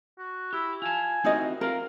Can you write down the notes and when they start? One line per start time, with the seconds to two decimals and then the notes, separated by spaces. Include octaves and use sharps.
0.19 F#4
0.53 E4 G4
0.82 F4 G#5 A5
1.24 C4 D#4 E4 F#4 A#4 D#5
1.61 C4 F4 A#4 F5